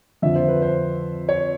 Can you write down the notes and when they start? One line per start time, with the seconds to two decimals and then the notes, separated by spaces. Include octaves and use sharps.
0.22 F2 D3 F3 E5
0.36 C5
0.48 B4
0.62 C5
1.29 C#5